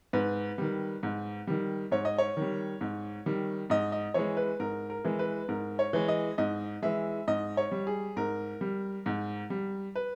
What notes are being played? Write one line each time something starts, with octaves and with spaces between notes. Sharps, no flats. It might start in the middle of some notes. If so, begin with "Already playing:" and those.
G#2 B4
D#3 G3
G#2
D#3 G3
G#2 C#5
D#5
C#5
D#3 G3
G#2
D#3 G3
G#2 D#5
D#5
E3 G#3 C#5
B4
G#2 A#4
A#4
E3 G#3
B4
G#2 A#4
C#5
E3 G#3
D#5
G#2 D#5
E3 G#3 E5
G#2 D#5
C#5
G3
G#4
G#2 A#4
G3
G#2
G3
B4